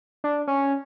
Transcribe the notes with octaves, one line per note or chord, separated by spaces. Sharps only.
D4
C#4